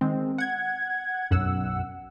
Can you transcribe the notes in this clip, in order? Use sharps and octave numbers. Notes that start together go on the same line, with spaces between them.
D#3 G#3 C4
F#5 G#6
B1 F#2 F#5 E6